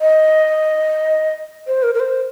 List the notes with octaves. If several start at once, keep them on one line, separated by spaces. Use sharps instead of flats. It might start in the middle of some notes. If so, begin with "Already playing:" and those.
D#5
C5
A#4
A#4
C5